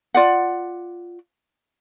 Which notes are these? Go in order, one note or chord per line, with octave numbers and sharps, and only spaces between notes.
F4 D5 F#5